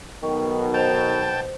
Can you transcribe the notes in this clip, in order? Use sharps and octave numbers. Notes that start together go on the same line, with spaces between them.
B1 B2 D#3 G5 C#6
C5 G5 A5 F7